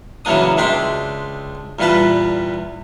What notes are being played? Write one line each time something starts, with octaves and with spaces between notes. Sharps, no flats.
C#3 E3 F#3 A#3 D4 D#6
C#2 G#3 D4 E5 G5 C6
E2 A#2 G3 F4 B4 A5